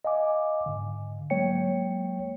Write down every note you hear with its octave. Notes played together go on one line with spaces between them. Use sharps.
D#5 F5 G#5 D6
G#2 D3
F#3 G#3 A#3 C#5 G5 C#7